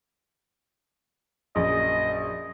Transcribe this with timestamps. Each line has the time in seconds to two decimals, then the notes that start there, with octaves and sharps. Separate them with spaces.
1.56 A#1 F#2 D#5